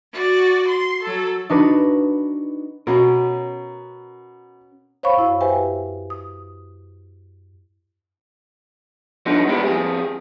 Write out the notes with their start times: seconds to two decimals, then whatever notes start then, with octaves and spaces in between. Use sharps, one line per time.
0.13 F#4 D5
0.68 C6
1.03 F#3 A4
1.50 D4 D#4 F#4 B4
2.87 B2 C#4 A#4
5.03 C5 C#5 F5 B5 C#6
5.17 F#2 E4 F5
5.41 G4 B4 C5 E5 G5 G#5
6.10 D#6
9.26 F3 B3 D4 D#4
9.48 G#3 B3 E4 G4
9.66 F2 G#4